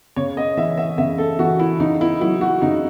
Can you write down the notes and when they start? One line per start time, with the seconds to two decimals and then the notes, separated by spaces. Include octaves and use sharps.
0.16 C#3 C#5
0.37 D#5
0.57 E3 E5
0.78 E5
0.98 C#3 E5
1.18 A4
1.39 E3 F#4
1.59 E4
1.80 C#3 D#4
2.01 E4
2.21 F#3 E4
2.41 F#4
2.62 C#3 D#4